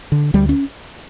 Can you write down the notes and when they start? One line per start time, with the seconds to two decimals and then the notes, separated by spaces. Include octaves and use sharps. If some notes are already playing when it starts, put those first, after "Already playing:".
0.12 D3
0.34 D2 G3
0.49 C#4